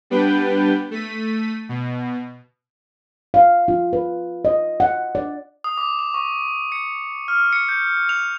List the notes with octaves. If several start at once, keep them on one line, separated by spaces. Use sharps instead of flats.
G3 B3 D4 G4 B4 G5
A3 B6 D#7
B2
F5
F4
B4
D#5
F#5
D5
D#6
D6
F7
C#6
C#7
F6
C#7
G6
F7